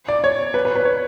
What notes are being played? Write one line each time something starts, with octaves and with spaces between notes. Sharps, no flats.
D5
C#5
B4
B4
B4
C#5